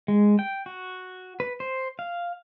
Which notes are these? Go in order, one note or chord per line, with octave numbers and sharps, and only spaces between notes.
G#3
G5
F#4
B4
C5
F5